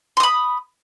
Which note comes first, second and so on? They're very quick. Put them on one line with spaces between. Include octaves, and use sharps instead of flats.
C6 D#6 B5